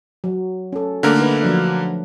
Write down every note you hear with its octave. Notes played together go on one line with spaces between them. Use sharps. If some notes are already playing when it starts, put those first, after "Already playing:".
F#3
C#4 A4
D3 A3 A#3 A#4
D#4 B4
F3 F#3 D4